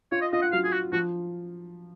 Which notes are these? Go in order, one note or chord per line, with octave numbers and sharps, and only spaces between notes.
F4 C#5
D#5
F4 D#5
F#5
F#3 F5
G#4
F#4
F3 F#4